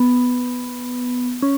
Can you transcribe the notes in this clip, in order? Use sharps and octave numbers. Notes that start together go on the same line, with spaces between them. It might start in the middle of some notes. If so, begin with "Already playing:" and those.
Already playing: B3
C#4